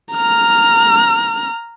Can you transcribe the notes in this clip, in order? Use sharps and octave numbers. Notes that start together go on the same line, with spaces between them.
A#5 F6